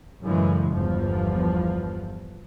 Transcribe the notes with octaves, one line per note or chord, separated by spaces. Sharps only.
F#2 A2 C#3 E3 G#3
G1 E2 F3